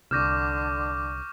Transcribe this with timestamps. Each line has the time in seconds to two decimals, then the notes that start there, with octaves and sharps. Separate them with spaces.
0.11 C2 D3 C#6 D6 F6 G6 A#6 E7